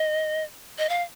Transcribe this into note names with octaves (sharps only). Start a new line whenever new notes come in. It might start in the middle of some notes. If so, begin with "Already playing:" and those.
Already playing: D#5
D#5
F5